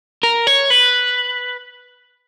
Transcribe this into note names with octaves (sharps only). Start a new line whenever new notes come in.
A#4
C#5
B4